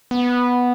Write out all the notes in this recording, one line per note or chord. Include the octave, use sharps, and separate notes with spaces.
B3